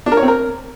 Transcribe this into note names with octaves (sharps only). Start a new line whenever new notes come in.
D4
A#4
C#5
C4
A#4